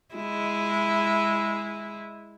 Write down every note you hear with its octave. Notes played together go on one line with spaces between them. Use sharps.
G#3 E4